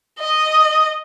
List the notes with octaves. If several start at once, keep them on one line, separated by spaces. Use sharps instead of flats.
D#5